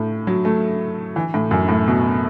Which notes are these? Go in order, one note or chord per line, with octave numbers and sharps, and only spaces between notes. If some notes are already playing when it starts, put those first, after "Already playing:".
Already playing: A2
F#3
A3
E3
A2
F#2
A2
B2